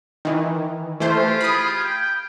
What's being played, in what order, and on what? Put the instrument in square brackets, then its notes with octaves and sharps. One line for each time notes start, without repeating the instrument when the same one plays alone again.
[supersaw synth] D#3 E3
[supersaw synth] E3 A3 C5 [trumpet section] F4 G4 G#4
[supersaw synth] B5 D#6
[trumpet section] G5